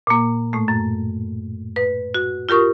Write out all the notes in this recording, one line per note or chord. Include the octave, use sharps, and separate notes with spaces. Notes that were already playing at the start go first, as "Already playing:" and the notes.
A#2 A#3
A2 A3
F#2
B4
F#4
F4 G4 A#4 C#6 D#6